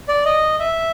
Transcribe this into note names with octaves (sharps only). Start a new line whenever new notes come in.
D5
D#5
E5